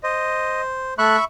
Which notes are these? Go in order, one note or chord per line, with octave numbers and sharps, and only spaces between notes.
C5 D#5
A3 E5 B5 C#6 F#6